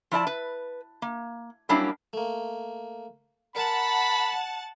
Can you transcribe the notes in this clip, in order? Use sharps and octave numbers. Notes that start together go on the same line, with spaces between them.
F3 E4 D5 A5
B4
A#3
F#3 G3 A#3 C#4 D4 E4
A3 A#3
A#4 F#5 A5 B5